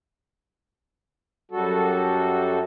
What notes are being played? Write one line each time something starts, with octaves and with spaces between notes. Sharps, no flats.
F#2 G3 F#4 A4